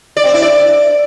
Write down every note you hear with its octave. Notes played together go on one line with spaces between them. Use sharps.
D5
C4
E4
D5